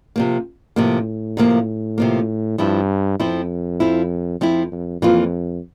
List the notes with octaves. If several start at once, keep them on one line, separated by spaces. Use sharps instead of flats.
C3 F3 A#3
A2 C3 F3 A#3
C3 F3 A#3
C3 F3 A#3
G2 F3 C4 E4
F2 F3 C4 E4
F3 C4 E4
F2 F3 C4 E4
F2
F2 E3 A#3 F4